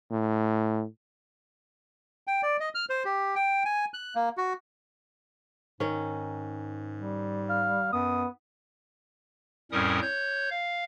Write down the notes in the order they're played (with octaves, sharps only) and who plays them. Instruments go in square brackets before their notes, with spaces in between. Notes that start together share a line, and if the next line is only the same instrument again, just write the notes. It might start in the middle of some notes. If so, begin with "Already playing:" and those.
[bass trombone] A2
[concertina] G5
D5
D#5
F6
C5
G4
G5
G#5
F#6
A#3
F#4
[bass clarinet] G#2 [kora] D#3 C#4
[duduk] G3
[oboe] F5
[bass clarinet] F#2 [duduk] B3 [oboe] D#6
[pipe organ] F2 A2 G3 C#4 A#4 D#6
C#5 G6
F5